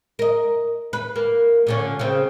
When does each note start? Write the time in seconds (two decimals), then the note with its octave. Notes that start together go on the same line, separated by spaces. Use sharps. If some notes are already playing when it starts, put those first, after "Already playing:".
0.19 A#4 D#5
0.93 B4
1.16 A#3
1.67 A#2 D3 C#4
1.99 C#3 C4